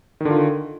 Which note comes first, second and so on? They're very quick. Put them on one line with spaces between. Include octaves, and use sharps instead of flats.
D#3 D3 F4